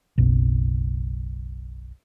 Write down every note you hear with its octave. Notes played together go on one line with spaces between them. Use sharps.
F#1 B1